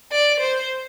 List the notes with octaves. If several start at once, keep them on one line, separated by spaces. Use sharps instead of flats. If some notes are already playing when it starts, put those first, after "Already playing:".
D5
C5